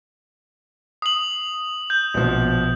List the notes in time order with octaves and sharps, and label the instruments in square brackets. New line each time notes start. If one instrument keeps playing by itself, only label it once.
[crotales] D#6 F#7
G6
[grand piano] A#1 B2 F3